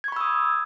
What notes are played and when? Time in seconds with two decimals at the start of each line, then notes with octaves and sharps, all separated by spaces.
0.04 G#6
0.08 C#6
0.12 B5
0.16 E6
0.21 D#6